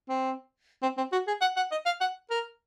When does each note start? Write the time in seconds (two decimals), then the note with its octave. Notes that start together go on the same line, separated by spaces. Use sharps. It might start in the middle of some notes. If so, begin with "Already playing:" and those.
0.09 C4
0.82 C4
0.98 C4
1.12 F#4
1.27 G#4
1.41 F#5
1.57 F#5
1.71 D#5
1.86 F5
2.01 F#5
2.31 A#4